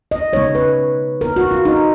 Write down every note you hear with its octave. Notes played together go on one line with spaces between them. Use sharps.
D#5
C#3 G#3 B3 D#4 C#5
B4
A#4
F#4
F4
D#4